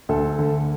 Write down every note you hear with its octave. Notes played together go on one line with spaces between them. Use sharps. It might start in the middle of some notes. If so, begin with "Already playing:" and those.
D2 A4
D3